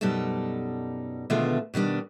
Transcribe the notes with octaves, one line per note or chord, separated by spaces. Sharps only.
F#2 B2 G3 D#4 A4 A5
B2 D3 D#3 G#3 A3 F4
B2 D#3 G3 D4